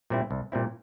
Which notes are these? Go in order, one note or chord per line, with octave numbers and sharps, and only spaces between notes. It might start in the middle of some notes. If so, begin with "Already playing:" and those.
A#2 G3 C4 E4
C2
A#2 G3 C4 E4